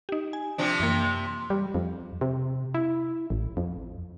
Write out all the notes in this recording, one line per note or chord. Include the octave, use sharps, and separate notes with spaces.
D#4 G4
G#5
C3 F3 D4
F#2 E3 A#3
G3
F2
C3
E4
A1
F2